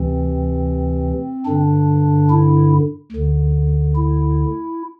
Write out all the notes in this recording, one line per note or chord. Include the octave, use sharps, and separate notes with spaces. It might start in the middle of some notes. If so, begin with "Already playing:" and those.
Already playing: D2 C3 E3 C4
G2 D3 D4
E4
D2 D3
E4